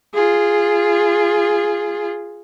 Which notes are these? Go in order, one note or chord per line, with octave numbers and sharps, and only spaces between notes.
F4 G#4